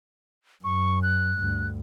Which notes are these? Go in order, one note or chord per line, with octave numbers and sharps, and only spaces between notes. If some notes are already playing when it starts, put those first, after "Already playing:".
F#2 C#6
F#6
D2 G2